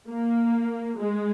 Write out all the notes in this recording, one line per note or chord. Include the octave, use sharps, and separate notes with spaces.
A#3
G#3